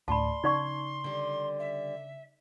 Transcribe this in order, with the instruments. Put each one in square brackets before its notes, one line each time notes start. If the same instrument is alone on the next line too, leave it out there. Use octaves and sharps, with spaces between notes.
[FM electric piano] D2 A2 [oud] D4 [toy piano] A5 B5 [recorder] C6
[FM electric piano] C#3 [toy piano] D#4 D5 C#6
[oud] D3 G3
[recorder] E5